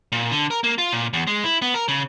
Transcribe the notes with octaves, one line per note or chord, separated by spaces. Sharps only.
A#2
D3
A#4
A#3
F4
A#2
E2
G#3
E4
B3
A#4
C#3